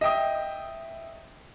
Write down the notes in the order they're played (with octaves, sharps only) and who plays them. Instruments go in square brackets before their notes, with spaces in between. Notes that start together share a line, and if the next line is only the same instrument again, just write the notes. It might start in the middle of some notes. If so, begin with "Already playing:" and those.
[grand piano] D#5 E5 G5 D#6